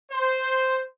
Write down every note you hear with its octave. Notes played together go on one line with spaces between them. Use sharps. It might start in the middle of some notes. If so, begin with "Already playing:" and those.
C5